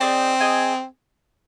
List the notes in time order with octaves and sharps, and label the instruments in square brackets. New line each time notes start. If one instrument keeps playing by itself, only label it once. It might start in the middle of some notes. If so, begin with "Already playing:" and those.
[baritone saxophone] C4 [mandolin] D#4 G#4 D5
[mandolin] G#4 D#5 G#5